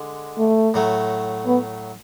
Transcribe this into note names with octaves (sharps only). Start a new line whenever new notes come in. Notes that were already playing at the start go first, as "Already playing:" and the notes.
Already playing: D3 G#3
A3
A2 F#3 A3
B3